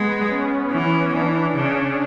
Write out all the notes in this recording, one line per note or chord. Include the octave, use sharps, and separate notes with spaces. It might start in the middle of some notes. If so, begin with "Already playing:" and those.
Already playing: G#3 B3
C#4
E3
E3 D4
C#3 C#4